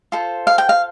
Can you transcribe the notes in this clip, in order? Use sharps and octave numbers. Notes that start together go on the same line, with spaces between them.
F4 A4 C5
F5
G5
F5